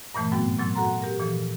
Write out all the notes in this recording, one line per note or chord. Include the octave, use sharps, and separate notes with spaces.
G2 A#2 E3 A3
G#2 F#3 B3 C4 F#4 G5
A#2 F#3 C6 E6
F#4 A4 F#5 A#5 C6
G4 A#4
A#2 E3 F3 A4